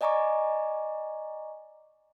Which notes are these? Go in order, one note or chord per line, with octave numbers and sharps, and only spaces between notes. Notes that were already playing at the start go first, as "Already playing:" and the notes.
D5 D#5 G#5 A#5 C#6 D6